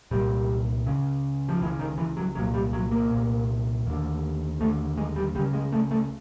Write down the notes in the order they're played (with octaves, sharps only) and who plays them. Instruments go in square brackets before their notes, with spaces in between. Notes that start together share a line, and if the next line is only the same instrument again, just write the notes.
[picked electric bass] C2 A#2 G3
C#2 C#3
F3
C#2 E3
C#3
D#3
E3
F#3
C2 A#2 F#3
G3
F#3
A#3
C2 A#2
D#2 D3
D#2 A3
D3
G#3
G3
C#2 G3
C#3
G#3
A3
A3